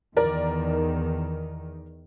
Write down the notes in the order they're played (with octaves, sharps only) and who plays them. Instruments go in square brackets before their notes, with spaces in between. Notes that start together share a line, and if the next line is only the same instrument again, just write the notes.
[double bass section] E2 D#3 [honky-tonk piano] A#4 D5